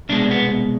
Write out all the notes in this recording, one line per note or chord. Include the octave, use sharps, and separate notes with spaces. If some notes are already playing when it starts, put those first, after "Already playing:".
C2 B2 G#3 D4
B3